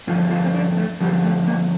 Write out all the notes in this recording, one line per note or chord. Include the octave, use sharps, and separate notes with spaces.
G2 D3 F3 F4
F4
C4
D4
A3
G2 D3 F3 G3
A3
A#3